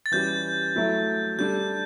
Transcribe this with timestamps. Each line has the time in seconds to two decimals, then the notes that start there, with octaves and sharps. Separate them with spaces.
0.06 A6
0.12 E3 G3 C#4 G4 G6
0.76 F#3 A3 E4
1.39 G3 D4 A4 G6